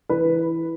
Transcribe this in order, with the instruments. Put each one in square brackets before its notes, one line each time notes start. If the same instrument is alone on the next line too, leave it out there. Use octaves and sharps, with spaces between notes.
[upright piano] E3 B4